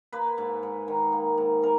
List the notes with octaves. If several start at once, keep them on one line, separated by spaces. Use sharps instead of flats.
A#3 B4
G#2
G#2
D#3
A#3
G#2
B2 A#4